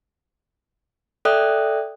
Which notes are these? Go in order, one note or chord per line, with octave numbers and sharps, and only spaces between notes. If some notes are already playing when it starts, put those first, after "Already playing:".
A4 D5 E5 G5 D#6 F#6